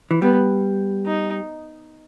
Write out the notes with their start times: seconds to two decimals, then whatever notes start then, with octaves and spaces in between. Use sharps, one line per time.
0.11 E3
0.22 G3 B3
1.07 D#4